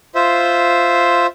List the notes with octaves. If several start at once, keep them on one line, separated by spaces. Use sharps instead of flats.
F4 C5 E5